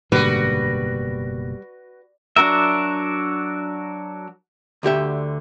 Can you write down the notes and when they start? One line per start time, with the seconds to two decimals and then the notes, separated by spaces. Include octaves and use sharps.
0.12 F#1 G#2 B2 D3 G3 A#3 F#4 B4
2.36 F#3 D4 F#4 A#4 E5
4.83 D2 D3 G4 E5